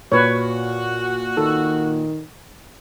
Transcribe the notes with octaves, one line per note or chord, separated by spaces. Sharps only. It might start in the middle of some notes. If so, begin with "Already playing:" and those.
A#2 F#4 B4 C#5
D#3 A4